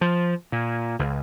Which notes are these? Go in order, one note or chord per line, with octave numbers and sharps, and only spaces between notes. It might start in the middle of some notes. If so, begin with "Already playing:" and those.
F3
A#2
C#2